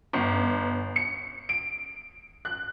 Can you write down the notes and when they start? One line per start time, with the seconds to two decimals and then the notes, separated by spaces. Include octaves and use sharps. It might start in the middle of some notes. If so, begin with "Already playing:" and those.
0.13 G1
0.96 C#7
1.49 D7
2.45 F#6